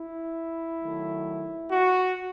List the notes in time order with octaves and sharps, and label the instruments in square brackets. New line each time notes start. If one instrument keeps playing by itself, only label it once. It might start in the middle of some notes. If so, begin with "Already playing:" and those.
Already playing: [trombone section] E4
D#3 F#3 A3
F#4